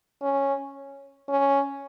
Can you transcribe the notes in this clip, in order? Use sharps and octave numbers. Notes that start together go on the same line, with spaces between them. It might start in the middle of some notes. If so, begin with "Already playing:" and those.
C#4
C#4